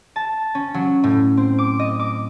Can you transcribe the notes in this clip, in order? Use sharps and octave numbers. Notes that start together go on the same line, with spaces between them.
A5
C#4
F#3
A2
C4
D6
D#5
D6